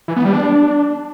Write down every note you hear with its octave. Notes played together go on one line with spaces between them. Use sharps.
E3
B3
G3
D4